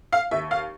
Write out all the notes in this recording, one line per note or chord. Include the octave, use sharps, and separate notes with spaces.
F5
D#2 E5
F5